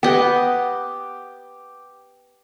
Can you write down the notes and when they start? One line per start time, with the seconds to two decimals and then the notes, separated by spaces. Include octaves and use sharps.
0.03 B3 G4 D#5 G5